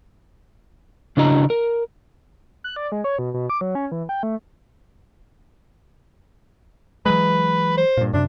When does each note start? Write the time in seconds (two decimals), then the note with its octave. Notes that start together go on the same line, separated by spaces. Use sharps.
1.17 C#3 D4 E4 F#4 D#5 A#5
1.50 A#4
2.64 F#6
2.76 D5
2.92 G#3
3.04 C#5
3.19 B2
3.34 B2
3.50 D6
3.61 F#3
3.75 C#4
3.92 E3
4.09 G5
4.23 A3
7.06 E3 F#3 G#3 B4
7.77 C5
7.97 G2 A#2
8.13 F#2 C3 D4